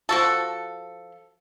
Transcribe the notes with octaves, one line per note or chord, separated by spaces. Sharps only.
F3 F#4 A4